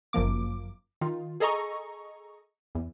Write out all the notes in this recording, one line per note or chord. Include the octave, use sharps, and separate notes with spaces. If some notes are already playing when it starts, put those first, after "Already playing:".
G1 F#2 F3 A#3 D6
D#3 F4
G#4 A4 D#5 A#5 C#6
E2